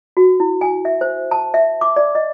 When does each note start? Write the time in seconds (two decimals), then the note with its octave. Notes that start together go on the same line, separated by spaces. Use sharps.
0.17 F#4
0.40 E4
0.61 G#5
0.85 E5
1.01 C5
1.31 A5
1.54 E5
1.81 D6
1.96 D5
2.15 D#5